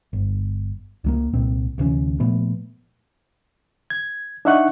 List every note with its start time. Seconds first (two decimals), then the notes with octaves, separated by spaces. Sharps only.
0.13 G1
1.04 C#2 F#3 A#3
1.33 C2 A#2 C4
1.78 D2 C3 E3 C#4
2.20 A#2 F3 A3 B3
3.90 G#6
4.45 D4 D#4 E5 F#5 C#6 F#6